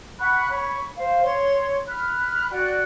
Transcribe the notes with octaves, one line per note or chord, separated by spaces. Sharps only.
F#5 B5 C#6 F#6
C#5 B5 C#6
C5 F5
C#5 C6
B5 F6 F#6
F#4 D5 G5 F#6